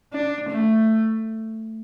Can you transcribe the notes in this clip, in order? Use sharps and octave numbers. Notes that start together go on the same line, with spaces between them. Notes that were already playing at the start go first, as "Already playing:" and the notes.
D4
A3